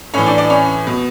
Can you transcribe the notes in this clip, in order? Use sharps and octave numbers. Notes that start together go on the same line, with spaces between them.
A2 E3 C#4 C#5
D4 D5
D4 D5
C#4 C#5
B2